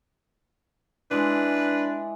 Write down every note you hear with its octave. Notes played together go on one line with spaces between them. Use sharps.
E3 G#3 D4 B4